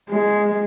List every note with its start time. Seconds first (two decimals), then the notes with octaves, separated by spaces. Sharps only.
0.11 G#3